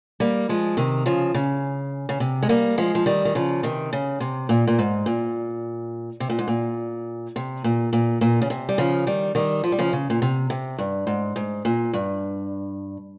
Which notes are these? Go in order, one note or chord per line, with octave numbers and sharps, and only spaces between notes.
G3 A#3
F3 G#3
C3 D#3
C#3 F3
C#3
C#3
C3
G#3
G3 A#3
F3 G#3
F3
D#3 G3
D#3
C#3 F3
C3 D#3
C#3
C3
A#2
A#2
G#2
A#2
C3
A#2
G#2
A#2
C3
A#2
A#2
A#2
C#3
C3
G3
C#3 F3
D#3 G3
D#3 G3
F3
G3
C#3 F3
C#3
A#2
C3
C3
G2
G#2
G#2
A#2
G2